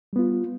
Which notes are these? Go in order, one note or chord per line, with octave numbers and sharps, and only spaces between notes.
G3 B3 F4